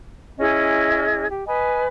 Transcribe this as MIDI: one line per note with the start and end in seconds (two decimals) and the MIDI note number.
0.38 1.27 61
0.38 1.27 64
0.38 1.27 68
0.38 1.27 75
1.29 1.42 67
1.46 1.86 71
1.46 1.86 75
1.46 1.86 80
1.46 1.86 83